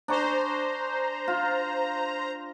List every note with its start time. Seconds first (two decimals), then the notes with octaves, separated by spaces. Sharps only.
0.08 D4 C5 G#5 A#5 C#6
1.28 F4